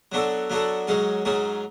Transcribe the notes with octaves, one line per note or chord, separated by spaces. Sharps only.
F#3 B3 D4 F#4 A4
F#3 B3 D4 F#4 A4
G#2 F#3 C#4 G#4
G#2 F#3 C#4 G#4